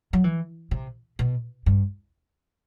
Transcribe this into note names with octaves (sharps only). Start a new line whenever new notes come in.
F#3
E3
C3
B2
G2